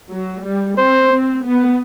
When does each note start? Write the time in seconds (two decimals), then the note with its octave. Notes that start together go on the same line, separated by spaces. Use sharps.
0.11 F#3
0.45 G3
0.78 C4 C5
1.11 C4
1.45 B3